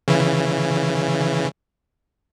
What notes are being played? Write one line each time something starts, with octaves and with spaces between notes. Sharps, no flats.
C#3 E3